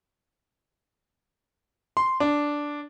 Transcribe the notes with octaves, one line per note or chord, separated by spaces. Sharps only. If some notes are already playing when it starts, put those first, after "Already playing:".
C6
D4